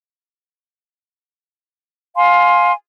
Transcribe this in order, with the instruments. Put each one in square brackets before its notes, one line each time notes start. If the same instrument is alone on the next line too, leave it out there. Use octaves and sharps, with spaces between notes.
[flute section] F5 G#5 C6